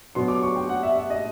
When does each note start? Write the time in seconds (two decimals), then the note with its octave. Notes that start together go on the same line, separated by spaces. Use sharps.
0.15 B2 F#3 B3 C6
0.28 D6
0.43 C#6
0.56 G5
0.69 F#5
0.83 E5
0.96 E5
1.10 D#5